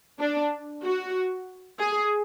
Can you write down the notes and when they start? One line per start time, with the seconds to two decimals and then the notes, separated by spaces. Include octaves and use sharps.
0.20 D4
0.84 F#4
1.79 G#4